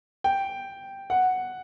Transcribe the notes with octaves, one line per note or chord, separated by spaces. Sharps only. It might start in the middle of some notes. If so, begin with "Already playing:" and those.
G5
F#5